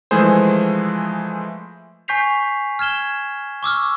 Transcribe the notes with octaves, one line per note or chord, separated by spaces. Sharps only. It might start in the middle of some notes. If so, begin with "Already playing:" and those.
E3 F3 G#3 A3 G#4 C5
G#5 C#6 G6 B6 C7 F7
F6 G#6 E7 G7
C#6 D6 E6 F6